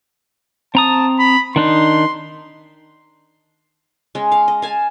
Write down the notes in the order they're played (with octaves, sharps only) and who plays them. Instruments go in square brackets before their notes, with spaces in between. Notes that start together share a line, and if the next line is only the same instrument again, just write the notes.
[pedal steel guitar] C4 A#5 D#6 [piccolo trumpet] A5
[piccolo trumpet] B5
[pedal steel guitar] D#3 D4 D#4 [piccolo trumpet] C6
[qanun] G#3 C#4
F5
D#5
F5 G#5 A5